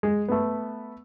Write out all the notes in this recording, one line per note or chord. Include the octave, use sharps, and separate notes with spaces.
G#3
A3 B3